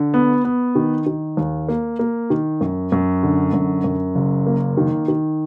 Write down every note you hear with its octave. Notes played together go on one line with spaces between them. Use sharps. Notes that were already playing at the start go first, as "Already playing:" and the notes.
Already playing: D3
B3
B3
D#3
D#3
D#2
A#3
A#3
D#3
F#2
F#2
D3
F#2
F#2
F#1
A#3
D#3
D#3